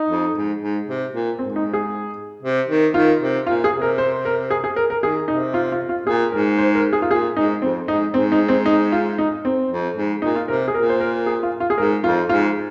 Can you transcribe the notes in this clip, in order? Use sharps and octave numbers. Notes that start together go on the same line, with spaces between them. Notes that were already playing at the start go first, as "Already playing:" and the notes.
Already playing: D#4
F2
G#2
G#2
C3
A#2
G#2 C4
D#4
G#4
C3
D#3
D#3 F4
C3
A#2 F4
G#4
C3
A#4
C5
A#4
G#4
G#4
A#4
A#4
D#3 G#4
C3 D#4
F4
F4
F4
A#2 G#4
G#2 A#4
C5
A#4
G#4
F4
A#2 G#4
G#2 D#4
F2 C4
G#2 D#4
G#2 C4
D#4
C4
D#4
F4
D#4
C4
F2
G#2
A#2 D#4
F4
C3 A#4
G#4
A#2 A#4
C5
A#4
G#4
F4
F4
G#4
G#2 A#4
F2 F4
G#2 F4